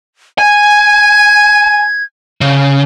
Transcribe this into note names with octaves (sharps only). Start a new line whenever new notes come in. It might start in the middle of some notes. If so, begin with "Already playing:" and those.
G#5 G#6
C#3